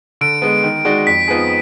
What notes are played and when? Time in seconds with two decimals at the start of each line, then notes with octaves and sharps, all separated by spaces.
0.21 D3 D7
0.42 G#3 B3
0.63 D#3
0.85 G#3 D#4 F#4 D5
1.06 F2 B6
1.28 F3 B3 D#4 G#4